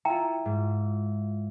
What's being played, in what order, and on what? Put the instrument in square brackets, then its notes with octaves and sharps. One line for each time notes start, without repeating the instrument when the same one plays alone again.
[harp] E4 F4 [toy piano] G5 A#5
[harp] G#2